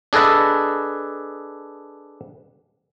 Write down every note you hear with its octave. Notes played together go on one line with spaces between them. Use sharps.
D4 G#4 A4 B4 D#5